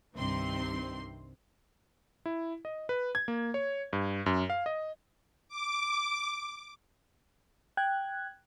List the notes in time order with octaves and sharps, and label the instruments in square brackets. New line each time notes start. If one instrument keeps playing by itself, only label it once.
[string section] C2 G2 C3 D#3 C4 C6
[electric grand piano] E4
D#5
B4
G#6
A#3
C#5
G2
F#2
F5
D#5
[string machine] D6
[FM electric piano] G5 F#6 G#6